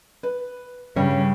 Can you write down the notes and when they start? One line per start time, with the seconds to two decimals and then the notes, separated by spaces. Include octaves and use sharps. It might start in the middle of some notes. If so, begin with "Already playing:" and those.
0.23 B4
0.96 G2 C#3 G3 C#4 C#5